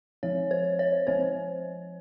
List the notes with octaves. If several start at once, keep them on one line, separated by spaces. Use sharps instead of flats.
F3 C4 C#5
C5
C#5
F3 C4 C5